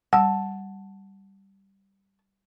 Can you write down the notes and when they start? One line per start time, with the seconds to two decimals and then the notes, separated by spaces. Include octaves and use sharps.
0.13 G3 F#5 A5 E6